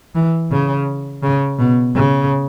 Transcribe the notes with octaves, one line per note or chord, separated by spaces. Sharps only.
E3
C#3
C#3
B2
C#3